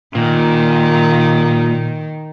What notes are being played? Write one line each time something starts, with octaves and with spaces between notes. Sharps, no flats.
A#2 D#3